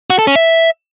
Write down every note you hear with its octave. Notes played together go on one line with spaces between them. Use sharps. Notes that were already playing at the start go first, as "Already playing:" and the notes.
F#4
A4
C#4
E5